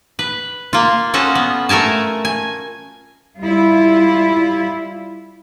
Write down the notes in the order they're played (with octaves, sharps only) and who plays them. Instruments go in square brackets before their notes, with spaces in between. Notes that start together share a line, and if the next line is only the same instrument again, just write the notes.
[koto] B4
A#3 F4
C#4 F4 F#4 A4 D#5
B3
A3 A4 A#4 G#5 A5
G#5
[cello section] G3 E4 F4